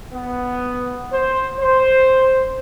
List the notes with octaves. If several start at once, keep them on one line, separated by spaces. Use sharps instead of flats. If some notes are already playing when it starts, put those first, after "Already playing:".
B3
C5
C5